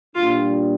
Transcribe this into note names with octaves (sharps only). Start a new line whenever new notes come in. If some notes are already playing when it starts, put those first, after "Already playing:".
A#2 G3 D4 F4